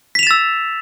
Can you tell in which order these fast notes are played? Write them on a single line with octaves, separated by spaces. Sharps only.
B6 F7 E7 A6 E6